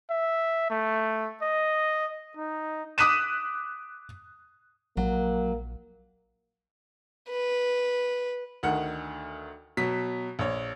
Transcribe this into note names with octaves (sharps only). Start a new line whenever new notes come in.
E5
A3
D#5
D#4
D6 D#6 F#6 B6 D#7 E7
A#1 F#3 A#3
B4
D2 D#3 F#5
B2 F#3 B6
A#1 C#5